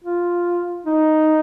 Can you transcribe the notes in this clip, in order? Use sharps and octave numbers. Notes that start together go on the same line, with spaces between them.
F4
D#4